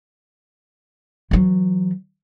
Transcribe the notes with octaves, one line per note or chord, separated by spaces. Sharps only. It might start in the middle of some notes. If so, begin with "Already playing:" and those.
E3 F#3